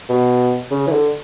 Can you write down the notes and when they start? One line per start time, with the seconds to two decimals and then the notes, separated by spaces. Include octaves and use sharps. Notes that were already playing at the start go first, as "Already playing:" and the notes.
0.09 B2
0.71 C#3
0.87 E3
0.92 D3